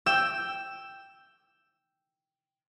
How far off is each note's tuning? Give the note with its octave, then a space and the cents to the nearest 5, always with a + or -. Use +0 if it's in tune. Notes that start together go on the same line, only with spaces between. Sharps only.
G5 +0 E6 +5